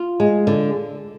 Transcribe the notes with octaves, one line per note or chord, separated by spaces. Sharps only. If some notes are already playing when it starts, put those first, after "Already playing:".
Already playing: F4
G#3
D3